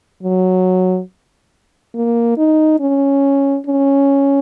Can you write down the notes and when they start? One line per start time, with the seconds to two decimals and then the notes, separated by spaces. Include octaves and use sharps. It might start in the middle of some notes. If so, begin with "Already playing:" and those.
0.23 F#3
1.94 A#3
2.37 D#4
2.80 C#4
3.66 C#4